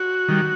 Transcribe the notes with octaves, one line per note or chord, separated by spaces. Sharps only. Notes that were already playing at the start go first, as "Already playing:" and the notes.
Already playing: F#4
D#3 G3